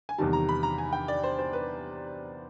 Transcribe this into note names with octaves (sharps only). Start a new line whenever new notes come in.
G#5
E2 C3 D#3 G3 A5
A#5
B5
A#5
G#5
G5
D5
C5
C5
B4